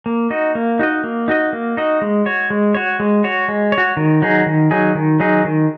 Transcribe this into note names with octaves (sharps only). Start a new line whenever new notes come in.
A#3
D#4 F#4 D#5
A#3
D#4 F#4 D#5
A#3
D#4 F#4 D#5
A#3
D#4 F#4 D#5
G#3
F#4 C#5
G#3
F#4 C#5
G#3
F#4 C#5
G#3
C#5
F#4
D#3
F#3 D#4 G#4
D#3
F#3 D#4 G#4
D#3
F#3 D#4 G#4
D#3